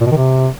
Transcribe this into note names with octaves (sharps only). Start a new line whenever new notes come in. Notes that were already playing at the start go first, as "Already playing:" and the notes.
A#2
B2
D#3
C3